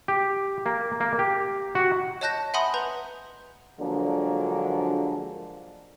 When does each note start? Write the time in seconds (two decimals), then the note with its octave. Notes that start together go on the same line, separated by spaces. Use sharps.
0.08 G4
0.66 A#3
1.00 A#3
1.19 G4
1.75 F#4
2.21 C#5 D#5 A5 F#6 G6 A#6
2.54 E5 F#5 G#5 B5 C6 D#6
2.74 B4 A#5 G6
3.79 D3 F3 F#3 G#3 A#3 D4